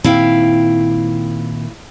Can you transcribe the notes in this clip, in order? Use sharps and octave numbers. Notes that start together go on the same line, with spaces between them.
A#2 D#3 C4 E4 F5 G5